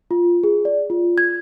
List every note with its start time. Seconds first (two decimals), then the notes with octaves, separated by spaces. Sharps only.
0.11 F4
0.44 G#4
0.65 D5
0.90 F4
1.18 G#6